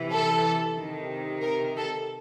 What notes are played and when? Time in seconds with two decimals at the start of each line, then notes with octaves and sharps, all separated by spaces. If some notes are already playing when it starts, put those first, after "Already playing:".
Already playing: C3 E3
0.12 A4
0.77 C3 D#3
1.43 A#4
1.77 A4